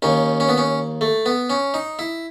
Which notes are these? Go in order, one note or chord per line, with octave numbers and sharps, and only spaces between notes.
D#2 D#3 C#4
C#4
B3
C#4
A3
B3
C#4
D#4
E4